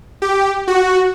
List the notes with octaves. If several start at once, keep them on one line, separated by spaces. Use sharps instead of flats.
G4
F#4